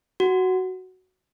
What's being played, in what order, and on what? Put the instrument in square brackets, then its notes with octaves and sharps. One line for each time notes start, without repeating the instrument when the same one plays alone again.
[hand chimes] F#4